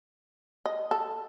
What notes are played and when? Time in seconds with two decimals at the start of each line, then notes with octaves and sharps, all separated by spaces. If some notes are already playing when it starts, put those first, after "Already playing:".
0.66 D#5
0.91 A4